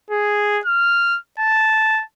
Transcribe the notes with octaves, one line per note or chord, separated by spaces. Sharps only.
G#4
F6
A5